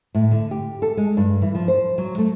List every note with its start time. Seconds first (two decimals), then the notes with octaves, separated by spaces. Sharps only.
0.15 A2
0.31 D3
0.51 G4
0.82 A4
0.97 G#3
1.17 G2
1.42 E3
1.55 F3
1.68 C5
1.98 F#3
2.18 A3